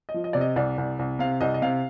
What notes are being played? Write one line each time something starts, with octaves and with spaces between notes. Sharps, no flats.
D#5
F3
D#5
C3 D5
D#5
C2 D5
C2
C2
C3 F5
C2 D#5
D#5
C3 F5